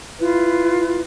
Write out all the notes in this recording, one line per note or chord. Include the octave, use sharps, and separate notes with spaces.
E4 F4 B4